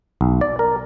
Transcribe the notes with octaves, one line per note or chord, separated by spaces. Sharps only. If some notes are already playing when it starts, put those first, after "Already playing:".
B1
D5
A#4